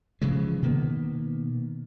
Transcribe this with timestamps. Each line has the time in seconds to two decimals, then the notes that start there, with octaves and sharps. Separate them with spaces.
0.22 C#3 E3 F3 G#3
0.62 B2 D#3 A#3 B3